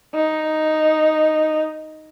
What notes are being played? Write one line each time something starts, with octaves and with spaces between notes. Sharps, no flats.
D#4